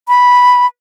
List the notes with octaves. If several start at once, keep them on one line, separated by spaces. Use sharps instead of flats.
B5